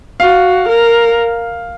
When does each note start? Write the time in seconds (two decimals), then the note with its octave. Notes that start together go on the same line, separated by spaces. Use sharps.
0.20 F#4 F5
0.68 A#4